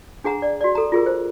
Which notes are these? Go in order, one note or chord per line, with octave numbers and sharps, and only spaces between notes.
D4 G#4 F#5 A#5
D5
F#4 D5
A4 A#5
F4 G#4 A#4
C5